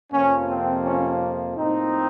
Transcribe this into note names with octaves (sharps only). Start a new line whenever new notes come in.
F2 C3 F3 A#3 C#4
C4
C#4
A2 F3 A#3 C4 D#4